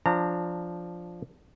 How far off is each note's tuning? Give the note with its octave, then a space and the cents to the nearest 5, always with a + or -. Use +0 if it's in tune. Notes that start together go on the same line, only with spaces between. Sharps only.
F3 +0 D4 +0 A#5 -25